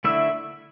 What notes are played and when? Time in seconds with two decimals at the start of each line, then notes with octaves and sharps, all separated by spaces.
0.04 D3 A3 E4 E5